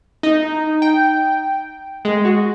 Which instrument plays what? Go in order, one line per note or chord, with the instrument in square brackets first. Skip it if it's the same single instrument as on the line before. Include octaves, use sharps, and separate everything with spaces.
[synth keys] D#4
G5
G#3
F#4